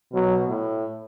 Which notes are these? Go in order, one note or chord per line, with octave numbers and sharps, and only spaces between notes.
B2 F#3
A2